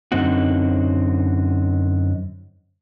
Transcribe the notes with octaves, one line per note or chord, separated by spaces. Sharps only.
F#2 D3 C4 D#4 F#4